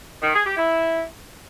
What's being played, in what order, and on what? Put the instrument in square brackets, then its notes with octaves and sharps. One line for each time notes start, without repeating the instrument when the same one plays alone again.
[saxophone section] D#3
G#4
G4
E4